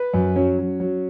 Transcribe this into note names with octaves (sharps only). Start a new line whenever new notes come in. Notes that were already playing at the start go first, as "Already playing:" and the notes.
Already playing: B4
F#2
F#3 C#4
F#3
F#3